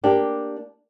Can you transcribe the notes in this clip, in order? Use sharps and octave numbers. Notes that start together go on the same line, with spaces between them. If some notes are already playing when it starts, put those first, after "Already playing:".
A#3 D4 G4